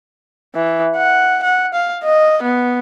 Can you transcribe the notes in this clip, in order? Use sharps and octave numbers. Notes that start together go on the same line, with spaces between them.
E3
F#5
F#5
F5
D#5
B3